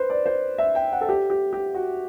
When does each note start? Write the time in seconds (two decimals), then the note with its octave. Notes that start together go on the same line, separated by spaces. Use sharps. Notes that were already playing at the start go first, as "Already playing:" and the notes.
Already playing: B4 C5
0.10 D5
0.26 C5
0.58 E5
0.75 G5
0.92 F#5
1.01 A4
1.09 G4
1.30 G4
1.53 G4
1.75 F#4